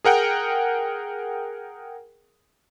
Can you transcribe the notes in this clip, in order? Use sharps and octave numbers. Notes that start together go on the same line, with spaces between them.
G#4 A#4 F#5 G5